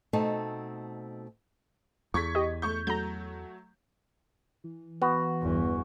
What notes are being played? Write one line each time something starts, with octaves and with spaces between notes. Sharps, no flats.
B2 A3 C4 D#4 A5
E2 C#6 G#6 B6
G4 D#5
A3 C#6 G6
F#3 A3 A#5 G6
E3
B3 F#4
G1 E2